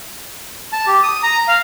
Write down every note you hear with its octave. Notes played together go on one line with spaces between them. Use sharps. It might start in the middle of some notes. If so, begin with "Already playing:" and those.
A5
G4
D#6
A#5
F5